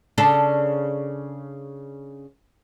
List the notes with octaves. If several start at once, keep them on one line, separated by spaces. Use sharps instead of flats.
C#3 D4 A4